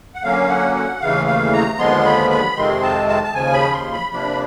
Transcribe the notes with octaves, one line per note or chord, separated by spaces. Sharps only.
F#5
D3 F#3 A#3 C#4 F5
F#5
F#5
D#2 C#3 E3 A3 F5
F5
A#5
D#2 D3 F3 G#3 B3 C6
B5
B5
F2 C3 D#3 G#3 C4 C6
A5
A5
A5
D#2 C#3 F3 G#5
B5
C6
B5
C3 F3 A#3 D4 B5